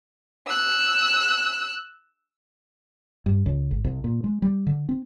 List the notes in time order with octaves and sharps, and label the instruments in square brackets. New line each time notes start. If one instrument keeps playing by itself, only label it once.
[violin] E6 F#6
[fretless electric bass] G2
C#2
G#1
C2
A#2
G#3
G3
D3
C4